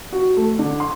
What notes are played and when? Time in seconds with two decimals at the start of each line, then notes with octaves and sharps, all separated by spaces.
0.12 F#4
0.37 A3
0.59 D3
0.80 C6